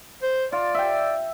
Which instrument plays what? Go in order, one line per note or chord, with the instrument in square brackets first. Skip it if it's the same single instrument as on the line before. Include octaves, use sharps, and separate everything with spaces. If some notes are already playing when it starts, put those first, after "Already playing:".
[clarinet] C5
[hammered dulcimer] F4 [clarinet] D5
[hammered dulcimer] E5 G5